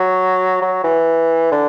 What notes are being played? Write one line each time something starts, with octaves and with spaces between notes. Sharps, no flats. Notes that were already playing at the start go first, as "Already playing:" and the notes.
Already playing: F#3
F#3
E3
D3